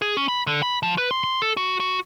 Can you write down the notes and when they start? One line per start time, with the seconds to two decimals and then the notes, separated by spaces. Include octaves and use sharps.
0.02 G#4
0.17 C#4
0.29 B5
0.47 D3
0.62 B5
0.83 F3
0.98 B4
1.11 C6
1.24 C6
1.42 A4
1.57 F#4
1.80 F#4